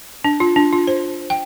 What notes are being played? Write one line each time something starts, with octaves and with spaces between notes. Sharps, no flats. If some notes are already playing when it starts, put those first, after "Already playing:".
D4
F4
D4
F4
C5
G5